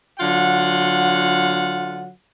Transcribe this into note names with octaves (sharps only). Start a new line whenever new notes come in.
D3 F#3 F4 F#5